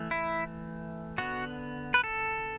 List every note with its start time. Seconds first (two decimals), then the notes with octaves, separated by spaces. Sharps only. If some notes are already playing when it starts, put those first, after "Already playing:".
Already playing: E3 A3
0.11 E4
1.18 D3 B3 F#4
1.94 B4
2.04 A4